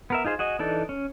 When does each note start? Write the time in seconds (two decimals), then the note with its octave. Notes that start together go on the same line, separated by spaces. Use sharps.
0.10 B3 A#4 E5
0.25 D#4 F4 G#4 C5
0.39 F#4 G#4 D#5
0.59 E3 D4 D#4 A4 D5
0.89 C#4